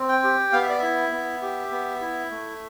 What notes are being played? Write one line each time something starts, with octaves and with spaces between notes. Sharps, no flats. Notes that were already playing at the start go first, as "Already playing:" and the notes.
Already playing: C4
G5
G4
B3 F5
E5
D5
E4 E5
B3
G4
B3
E4
A3